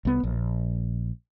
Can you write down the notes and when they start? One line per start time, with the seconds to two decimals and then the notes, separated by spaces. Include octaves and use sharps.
0.05 C2 B3
0.23 A#1